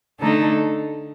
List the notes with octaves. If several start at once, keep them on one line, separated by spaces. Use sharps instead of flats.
D3 A3 D#4 A4